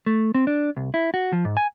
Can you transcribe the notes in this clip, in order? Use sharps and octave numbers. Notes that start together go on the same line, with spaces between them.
A3
C4
D4
C2
E4
F#4
F3
G#2
G#5